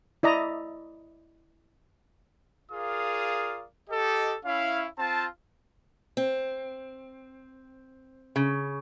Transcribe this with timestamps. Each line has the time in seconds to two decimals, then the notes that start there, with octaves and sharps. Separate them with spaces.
0.23 E4 D5 D#5 A#5
2.71 F4 G#4 A#4 D5 F5 D#6
3.90 G4 A4 D#5
4.45 C#4 E4 F5
4.99 C4 F4 A5
6.17 C4
8.36 C#3